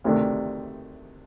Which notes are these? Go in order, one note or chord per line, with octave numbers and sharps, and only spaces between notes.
D2 C3 D#3 A3 D4